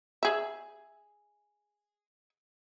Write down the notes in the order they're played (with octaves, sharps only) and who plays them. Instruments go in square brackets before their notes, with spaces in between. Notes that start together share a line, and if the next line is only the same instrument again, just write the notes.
[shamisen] G#4 E5